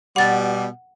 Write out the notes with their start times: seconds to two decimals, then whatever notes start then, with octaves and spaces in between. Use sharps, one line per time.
0.16 B2 G3 F#5 A6